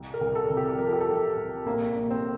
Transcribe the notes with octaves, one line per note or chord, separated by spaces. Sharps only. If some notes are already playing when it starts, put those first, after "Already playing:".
Already playing: C2
A#4
C2
A4
C3
G4
F3 A#4
A4
G4
A4
C2
C2
A#1 A#3
A#1
C4